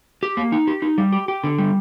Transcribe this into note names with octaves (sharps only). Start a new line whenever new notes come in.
G4
A#3
D#4
G4
D#4
G3
G4
G4
D3
G3